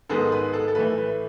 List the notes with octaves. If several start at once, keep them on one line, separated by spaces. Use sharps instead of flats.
G#2 D#3 G#3 B3 A4
B4
A4
A4
A2 E3 A3 B4
B4